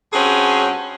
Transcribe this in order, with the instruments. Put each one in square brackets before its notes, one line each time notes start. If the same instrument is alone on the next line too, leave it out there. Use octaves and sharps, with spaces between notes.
[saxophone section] G2 C4 C#4 F#4 G#4